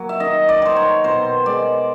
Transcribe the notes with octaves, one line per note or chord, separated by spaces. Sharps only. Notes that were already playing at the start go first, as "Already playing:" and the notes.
Already playing: F#3 A#3
E5
D#3 D#5
D5
D#3 C5
C#5
B2 C5
G#3 D5